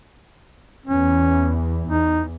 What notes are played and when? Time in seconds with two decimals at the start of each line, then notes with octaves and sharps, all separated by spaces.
0.86 E2 E3 C#4
1.88 E2 D#4